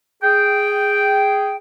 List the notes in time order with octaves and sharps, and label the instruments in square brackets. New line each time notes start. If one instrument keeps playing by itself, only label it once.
[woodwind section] G#4 G5